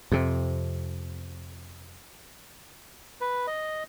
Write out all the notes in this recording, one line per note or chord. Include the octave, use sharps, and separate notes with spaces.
F2 C3
B4
D#5